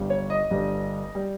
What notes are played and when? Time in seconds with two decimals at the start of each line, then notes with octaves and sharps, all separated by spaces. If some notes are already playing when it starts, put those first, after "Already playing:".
Already playing: G1 G2 G3
0.10 C#5
0.30 D#5
0.50 G1 G2 G3
1.15 G3